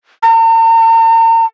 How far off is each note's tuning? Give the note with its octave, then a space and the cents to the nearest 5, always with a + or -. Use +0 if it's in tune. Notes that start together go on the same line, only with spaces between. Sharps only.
A#5 -45